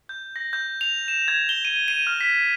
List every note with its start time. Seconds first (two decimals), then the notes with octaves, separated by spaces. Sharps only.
0.09 G6
0.36 A#6
0.53 G6
0.81 F7
1.08 E7
1.28 G#6
1.49 G7
1.65 D#7
1.88 D#7
2.07 F6
2.21 B6